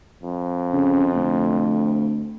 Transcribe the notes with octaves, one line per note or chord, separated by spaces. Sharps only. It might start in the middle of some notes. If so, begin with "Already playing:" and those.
F2
C#3
D2